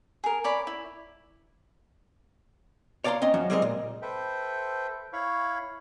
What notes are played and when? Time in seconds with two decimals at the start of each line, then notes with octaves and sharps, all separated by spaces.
0.24 G#4 A#4
0.44 C#5 D5 B5
0.67 E4
3.04 C#5 D5 F5 A5 A#5 C6
3.22 C4 C#4 D#5 C6
3.34 F#2 F3 F#3 C#4
3.50 G3 G#3 C4 A#4 B4 D#5
3.62 A#2
4.02 A4 B4 C5 E5 G5
5.13 E4 C#5 F5 B5 C#6